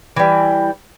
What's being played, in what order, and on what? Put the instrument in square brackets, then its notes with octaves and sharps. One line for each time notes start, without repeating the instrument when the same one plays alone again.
[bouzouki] E3 G3